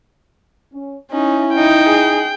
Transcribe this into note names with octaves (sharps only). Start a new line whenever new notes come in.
C#4
C#4 D#4 E4
D#4 G5
G#4